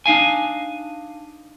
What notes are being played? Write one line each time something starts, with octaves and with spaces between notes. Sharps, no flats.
D4 D#4 F5 G#5